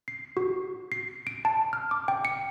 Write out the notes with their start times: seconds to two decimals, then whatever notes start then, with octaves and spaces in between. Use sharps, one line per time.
0.08 C7
0.37 F#4
0.92 C7
1.27 D7
1.45 A5
1.73 F6
1.91 D6
2.08 G5
2.25 C#7